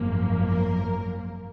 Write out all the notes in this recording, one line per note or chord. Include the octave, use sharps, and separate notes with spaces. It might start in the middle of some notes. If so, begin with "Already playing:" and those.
Already playing: G#1 F#2 F3 A#3
A#4